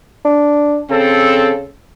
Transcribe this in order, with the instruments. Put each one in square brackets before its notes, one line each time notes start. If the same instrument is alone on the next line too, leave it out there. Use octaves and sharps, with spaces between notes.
[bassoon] D4
[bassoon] C#3 [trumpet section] C4 A4